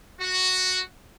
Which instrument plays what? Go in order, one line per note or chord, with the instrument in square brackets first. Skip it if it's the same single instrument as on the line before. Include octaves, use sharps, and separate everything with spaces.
[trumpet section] F#4